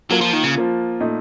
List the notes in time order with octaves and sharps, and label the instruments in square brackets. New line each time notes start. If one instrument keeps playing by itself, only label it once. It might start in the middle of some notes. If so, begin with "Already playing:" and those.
[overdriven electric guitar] F#3 [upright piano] A#3 F4 A#4
[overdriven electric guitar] F3
D#3
C#3
[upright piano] F3 A#3 F4
A#2 A3 D#4